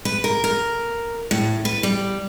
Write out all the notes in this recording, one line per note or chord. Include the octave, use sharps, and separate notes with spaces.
B4
A#4
A#4
A2
B4
G3